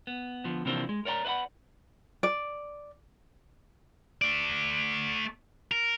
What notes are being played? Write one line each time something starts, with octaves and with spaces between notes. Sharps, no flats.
B3
D3 F3 B3
C3 E3 F3 A#3 C4 D4
G#3
A#4 C#5 D5 F#5 A#5
B4 D5 E5 F#5 B5
D5
A3 D5
A#4